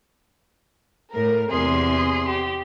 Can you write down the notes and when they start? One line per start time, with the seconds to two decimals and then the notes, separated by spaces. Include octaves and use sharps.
1.13 A2 A#4
1.51 E2 C3 G#4 C6
2.29 G4